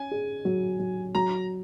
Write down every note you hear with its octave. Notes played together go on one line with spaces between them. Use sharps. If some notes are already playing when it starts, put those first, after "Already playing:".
Already playing: C#4 G#5
G#4
F#3
F#3
F#3 A#5